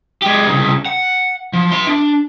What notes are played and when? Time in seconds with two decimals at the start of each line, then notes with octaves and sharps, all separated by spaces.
0.22 G#3 G4
0.47 C2 C#3
0.86 F#5
1.53 F3
1.71 E5 C6
1.87 D4